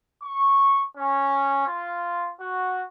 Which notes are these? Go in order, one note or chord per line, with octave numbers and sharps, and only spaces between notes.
C#6
C#4
F4
F#4